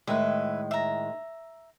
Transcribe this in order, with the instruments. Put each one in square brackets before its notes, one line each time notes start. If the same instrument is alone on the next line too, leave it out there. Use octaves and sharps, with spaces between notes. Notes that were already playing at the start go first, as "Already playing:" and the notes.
[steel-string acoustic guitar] A2 D#3 G#3 [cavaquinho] B4 E5
[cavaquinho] E5 A#5